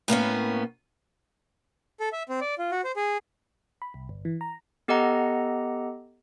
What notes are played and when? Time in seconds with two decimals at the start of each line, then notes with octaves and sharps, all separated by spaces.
0.08 A2 A#3 B3 C#4
2.00 A4
2.13 E5
2.29 C4
2.41 D5
2.58 F4
2.71 F#4
2.84 C5
2.96 G#4
3.82 B5
3.94 C2
4.09 G1
4.25 E3
4.41 A#5
4.88 B3 G4 A4 D#5 F#5 A#5